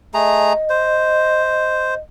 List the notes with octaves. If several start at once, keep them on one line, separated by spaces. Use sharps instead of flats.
A3 G#4 D#5 A#5
C5